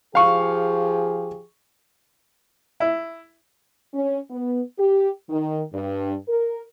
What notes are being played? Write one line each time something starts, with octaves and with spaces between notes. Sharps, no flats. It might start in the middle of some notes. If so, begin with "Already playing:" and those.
F3 G4 G#4 F5 C#6
E4
C#4
B3
G4
D#3
G2
A#4